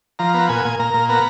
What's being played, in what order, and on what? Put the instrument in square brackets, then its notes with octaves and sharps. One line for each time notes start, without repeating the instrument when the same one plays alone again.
[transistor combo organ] F3 A#5
B3
A#2 G#5
A#2
A#2 A#5
A#2
B3 A#5